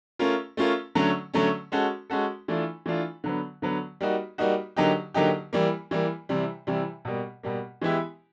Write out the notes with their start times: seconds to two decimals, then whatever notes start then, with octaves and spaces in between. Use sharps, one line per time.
0.19 A3 C#4 F4 A#4
0.57 A3 C#4 F4 A#4
0.95 D3 F#3 A3 C#4
1.33 D3 F#3 A3 C#4
1.72 G#3 C#4 F#4 A4
2.10 G#3 C#4 F#4 A4
2.48 E3 A3 D4 F4
2.86 E3 A3 D4 F4
3.24 D3 F#3 B3
3.62 D3 F#3 B3
4.01 G3 A#3 D#4 F#4
4.38 G3 A#3 D#4 F#4
4.76 D3 F#3 A#3 D#4 G4
5.14 D3 F#3 A#3 D#4 G4
5.53 E3 G3 A#3
5.91 E3 G3 A#3
6.29 C3 E3 G3
6.67 C3 E3 G3
7.05 B2 G3 A#3
7.43 B2 G3 A#3
7.82 E3 G#3 B3 E4 G4